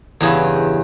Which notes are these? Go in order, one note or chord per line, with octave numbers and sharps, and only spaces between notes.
E2 G2 C#3